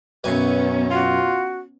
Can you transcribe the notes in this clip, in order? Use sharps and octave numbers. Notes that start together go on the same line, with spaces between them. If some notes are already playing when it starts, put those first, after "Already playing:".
B1 F#2 B3 C#4 B4 G#5
F4 F#4